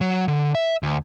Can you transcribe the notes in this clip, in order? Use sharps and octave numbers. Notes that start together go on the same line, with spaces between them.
F#3
D3
E5
D2